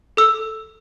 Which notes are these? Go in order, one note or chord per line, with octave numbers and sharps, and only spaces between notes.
A4 E6